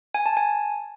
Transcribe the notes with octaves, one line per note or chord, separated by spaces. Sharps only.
G#5
A5
G#5